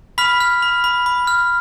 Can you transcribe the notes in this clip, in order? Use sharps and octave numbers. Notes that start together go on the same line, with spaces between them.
B5 F6 B6
F6
B5
B5
B5
F6